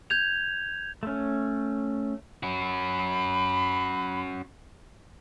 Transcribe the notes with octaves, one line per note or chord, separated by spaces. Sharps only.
G6 G#6 F7
A3 C#4
C#4 F#4 B5